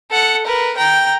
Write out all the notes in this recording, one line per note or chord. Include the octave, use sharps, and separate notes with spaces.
A4 F#5
A#4 B4
G5 A#5